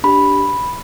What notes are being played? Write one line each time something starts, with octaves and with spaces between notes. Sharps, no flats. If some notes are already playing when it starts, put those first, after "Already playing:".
D4 G4 B5